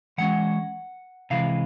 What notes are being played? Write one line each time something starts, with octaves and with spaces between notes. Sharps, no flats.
E3 G#3 C#4 F#5
C3 E3 G#3 F5